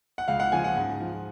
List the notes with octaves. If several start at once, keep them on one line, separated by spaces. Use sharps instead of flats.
F#5
C#2 F5
F#5
C#3 F3 G#5
F#5
G#2
F3